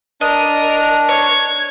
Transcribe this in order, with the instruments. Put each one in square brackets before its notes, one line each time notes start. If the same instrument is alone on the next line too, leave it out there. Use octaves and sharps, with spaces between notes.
[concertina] D4 [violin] A#4 [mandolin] D#5
[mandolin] C#5 [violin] G#6